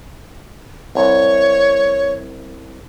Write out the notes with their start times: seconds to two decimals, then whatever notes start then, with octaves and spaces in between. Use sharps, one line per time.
0.95 C2 C#5